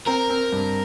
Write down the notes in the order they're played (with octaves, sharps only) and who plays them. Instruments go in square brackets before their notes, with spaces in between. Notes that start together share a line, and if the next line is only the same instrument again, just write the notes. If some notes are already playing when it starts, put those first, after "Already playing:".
[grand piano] C4 [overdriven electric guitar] A#4
[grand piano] C4
G2